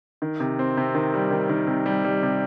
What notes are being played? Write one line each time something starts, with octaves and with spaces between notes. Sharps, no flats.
D#3
C3
C4
C3
D#3
G3
D#3
D#3
C3
G3
G3
C3